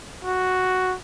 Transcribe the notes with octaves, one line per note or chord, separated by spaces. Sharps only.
F#4